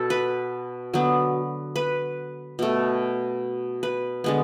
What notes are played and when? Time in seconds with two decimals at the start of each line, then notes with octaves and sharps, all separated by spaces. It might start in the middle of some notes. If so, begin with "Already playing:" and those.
Already playing: B2 A4
0.10 B4
0.93 D3 F#3 B3
1.76 B4
2.59 B2 A3
3.83 B4
4.24 D3 G#3 B3